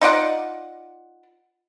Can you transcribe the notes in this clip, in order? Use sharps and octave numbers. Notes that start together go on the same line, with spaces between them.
D#4 F4 D5 F#5